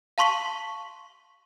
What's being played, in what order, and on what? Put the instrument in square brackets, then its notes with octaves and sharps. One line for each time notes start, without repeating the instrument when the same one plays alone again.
[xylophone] F5 A5 C6 C#6 B6 F#7